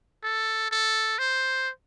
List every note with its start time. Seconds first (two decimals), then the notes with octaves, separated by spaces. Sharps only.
0.23 A4
0.71 A4
1.19 C5